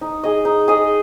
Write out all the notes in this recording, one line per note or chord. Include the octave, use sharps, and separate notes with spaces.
D#4
G#4 D#5
D#4
G#4 D#5